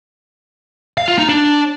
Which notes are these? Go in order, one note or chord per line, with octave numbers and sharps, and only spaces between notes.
F5
F4
D#4
D4